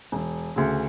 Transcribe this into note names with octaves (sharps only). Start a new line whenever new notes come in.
E1
D2 C#3